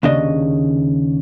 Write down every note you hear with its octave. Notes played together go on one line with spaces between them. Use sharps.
D#2 C#3 C#4 D4 D#5